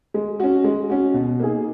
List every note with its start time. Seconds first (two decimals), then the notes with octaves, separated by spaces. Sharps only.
0.14 G#3
0.40 C#4 F#4
0.64 G#3
0.90 C#4 F#4
1.14 B2
1.40 A#3 D#4 G#4